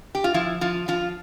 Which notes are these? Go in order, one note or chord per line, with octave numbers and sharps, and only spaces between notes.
G4
F4
F3 E4
F3 F4
F3 F4